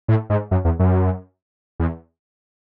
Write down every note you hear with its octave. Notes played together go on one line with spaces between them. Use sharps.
A2
G#2
F#2
E2
F#2
E2